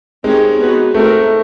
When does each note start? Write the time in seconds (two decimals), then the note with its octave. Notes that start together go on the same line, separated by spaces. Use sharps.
0.24 G#3 C4 D#4 G4 A#4 C#5
0.59 B3 D#4 F#4 B4
0.94 A3 C4 D#4 F#4 A#4